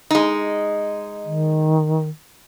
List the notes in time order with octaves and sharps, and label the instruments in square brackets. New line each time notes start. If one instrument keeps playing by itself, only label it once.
[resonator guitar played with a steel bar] G#3 D#4
[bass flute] D#3